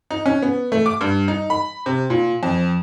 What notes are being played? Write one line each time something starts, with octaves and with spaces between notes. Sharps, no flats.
D#4
C#4
B3
A3
D6
G2
D#4
B5
C3
A#2
F2